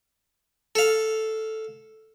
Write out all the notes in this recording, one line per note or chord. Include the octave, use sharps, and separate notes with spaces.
A4 F5